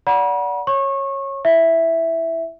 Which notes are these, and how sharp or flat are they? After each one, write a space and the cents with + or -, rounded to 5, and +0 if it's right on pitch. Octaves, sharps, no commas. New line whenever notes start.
D5 -25 F#5 -5 B5 -45
C#5 -15 C#6 -25
E4 +0 E5 +0